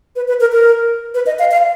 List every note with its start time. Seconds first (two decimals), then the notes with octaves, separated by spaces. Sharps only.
0.16 B4
0.28 B4
0.41 A#4
0.52 A#4
1.14 B4
1.26 D#5
1.39 F5
1.51 F5